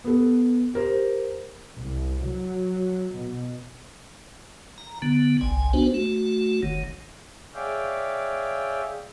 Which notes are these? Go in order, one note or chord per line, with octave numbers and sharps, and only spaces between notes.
B3 A4
G4 A#4 C5
C2
F#3
B2
A#5
D3 B3
G1 C2 G#5
B3 D4 F#4 C5
A3 F#4
F#1 D#3
G#4 C#5 D5 E5 F5 G5